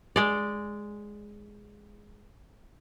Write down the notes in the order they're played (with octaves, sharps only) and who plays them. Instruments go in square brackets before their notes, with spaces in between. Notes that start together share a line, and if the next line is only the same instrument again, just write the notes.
[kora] G#3 D5